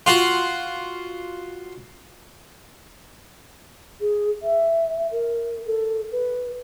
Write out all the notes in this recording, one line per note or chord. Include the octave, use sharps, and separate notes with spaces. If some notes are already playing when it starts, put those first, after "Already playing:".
F4 F#4
G#4
E5
A#4
A4
B4